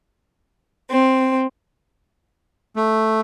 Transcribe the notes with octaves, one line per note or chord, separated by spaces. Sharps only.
C4
A3